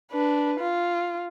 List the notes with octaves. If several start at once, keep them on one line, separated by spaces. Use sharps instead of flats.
D4 B4
F4